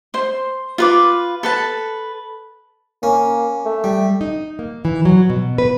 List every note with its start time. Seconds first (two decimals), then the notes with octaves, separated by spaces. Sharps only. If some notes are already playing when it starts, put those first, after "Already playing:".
0.14 C5 C6
0.78 F4 B4 D6
1.43 A4 B4 A5
3.03 A#3 C#4
3.66 A3
3.84 G3
4.21 D#4
4.59 A#3
4.85 E3
5.05 F#3
5.30 B2
5.58 B4